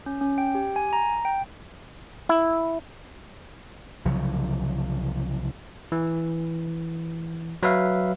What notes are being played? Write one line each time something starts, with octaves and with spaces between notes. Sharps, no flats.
C#4
C#4
G5
G4
G#5
A#5
G5
E4
C2 C#3 F3 F#3
E3
F#3 B4 E5 F5